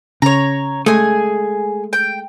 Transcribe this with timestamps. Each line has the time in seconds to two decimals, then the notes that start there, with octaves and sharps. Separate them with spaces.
0.22 C#3 C#5 A#5
0.86 G#3 A3 G#4 G#5
1.93 G5